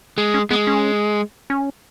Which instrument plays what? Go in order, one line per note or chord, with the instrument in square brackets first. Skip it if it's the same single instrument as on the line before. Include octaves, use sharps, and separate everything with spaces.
[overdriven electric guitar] G#3
[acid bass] C#4
[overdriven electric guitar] G#3 [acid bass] B3
[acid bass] C#4
C#4